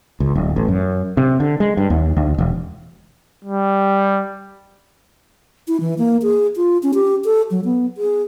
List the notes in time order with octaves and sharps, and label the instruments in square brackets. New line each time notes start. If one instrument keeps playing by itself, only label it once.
[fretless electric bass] C#2
D1
A1
F#2
C3
D3
G#3
G2
D#2
D2
E1
[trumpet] G3
[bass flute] E4
E3
A#3
G#4
F4
C#4
G4
A4
F#3
B3
G#4